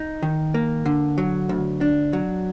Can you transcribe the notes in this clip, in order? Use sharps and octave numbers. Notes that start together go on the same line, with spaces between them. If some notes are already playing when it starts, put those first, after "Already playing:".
Already playing: D#4
D#3
A#3
D3
F#3
D2
D4
F#3